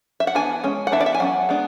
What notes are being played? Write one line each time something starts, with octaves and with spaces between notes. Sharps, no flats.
E5
F#5
E3 B3 D4 G#5
G#3 C#4
F#5
E3 B3 D4 E5
D5
E5
G#5
F#3 C#4 F#5
G#3 B3 D4